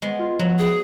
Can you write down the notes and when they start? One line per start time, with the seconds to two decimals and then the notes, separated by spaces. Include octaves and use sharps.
0.02 G#3 B3
0.19 F4
0.39 F3 F#3
0.59 G#4